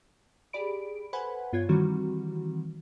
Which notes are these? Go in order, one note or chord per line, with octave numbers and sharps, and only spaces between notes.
G4 G#4 D5 B5 D7
A4 B4 C5 F#5 G#5 B5
G2 B3 F4 C#5 G#6
D#3 E3 G3 C4 F#4